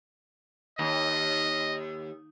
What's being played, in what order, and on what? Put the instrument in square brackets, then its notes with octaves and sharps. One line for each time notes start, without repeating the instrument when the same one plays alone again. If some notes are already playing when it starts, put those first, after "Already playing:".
[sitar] D#2 [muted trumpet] D#5